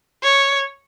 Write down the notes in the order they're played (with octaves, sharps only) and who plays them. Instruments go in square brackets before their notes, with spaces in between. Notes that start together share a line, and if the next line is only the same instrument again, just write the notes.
[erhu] C#5